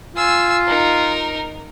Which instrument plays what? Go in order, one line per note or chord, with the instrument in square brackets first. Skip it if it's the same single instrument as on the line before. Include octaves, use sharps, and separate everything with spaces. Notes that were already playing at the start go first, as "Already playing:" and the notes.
[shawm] F4 [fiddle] G#5 E6
[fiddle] D#4 A#4